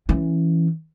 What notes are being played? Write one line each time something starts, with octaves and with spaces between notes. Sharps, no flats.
E3 C#4